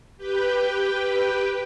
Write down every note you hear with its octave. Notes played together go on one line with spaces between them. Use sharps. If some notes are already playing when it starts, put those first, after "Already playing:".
G4 B4 G5